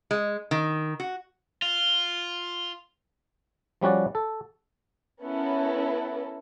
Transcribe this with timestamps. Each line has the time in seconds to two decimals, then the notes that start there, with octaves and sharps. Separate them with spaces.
0.11 G#3
0.51 D#3
1.00 F#4
1.62 F4
3.81 F3 G3 C#4 F#4 D5
4.15 A4
5.21 B3 C#4 E4 A4 A#4